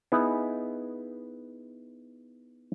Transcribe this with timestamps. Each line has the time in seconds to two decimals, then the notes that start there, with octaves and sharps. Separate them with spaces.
0.12 B3 D#4 E4 G#4